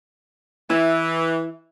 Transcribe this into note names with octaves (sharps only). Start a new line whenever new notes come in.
E3 E4